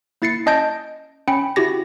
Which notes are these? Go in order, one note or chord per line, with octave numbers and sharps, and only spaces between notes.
A#3 E4 A6 C7 C#7
C#4 D#5 A5 G6 A#6 D7
C#4 G5 B5 C#7
E4 F#4 G4 A#6